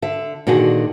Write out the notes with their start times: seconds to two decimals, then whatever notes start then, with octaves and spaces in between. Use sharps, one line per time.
0.02 D3 E5
0.47 A#2 D3 D#3 F#4 G#4